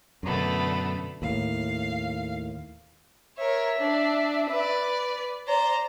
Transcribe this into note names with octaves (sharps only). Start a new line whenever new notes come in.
F#2 B2 D3 A3 B3
D#2 A2 F5
A#4 C#5 E5
D4
B4 D5
C5 D5 A#5